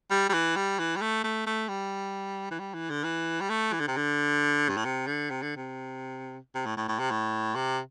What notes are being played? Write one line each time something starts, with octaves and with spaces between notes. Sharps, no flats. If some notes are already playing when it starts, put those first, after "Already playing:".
G3
G3
E3
G3
E3
G3
A3
A3
A3
G3
E3
G3
E3
D3
E3
G3
A3
E3
D3
C3
D3
G2
A2
C3
D3
C3
D3
C3
C3
A2
A2
A2
C3
A2
C3